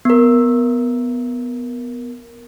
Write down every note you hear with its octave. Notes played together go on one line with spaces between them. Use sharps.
B3 A#4